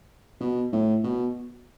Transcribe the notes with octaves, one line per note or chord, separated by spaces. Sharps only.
B2
A2
B2